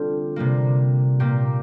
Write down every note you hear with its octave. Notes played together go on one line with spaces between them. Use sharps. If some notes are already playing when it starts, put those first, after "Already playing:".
Already playing: D3 G3 C4 F4
C3 G3 A#3
A#2 A#3 G4